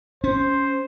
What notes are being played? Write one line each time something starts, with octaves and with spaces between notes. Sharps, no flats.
C#4 C5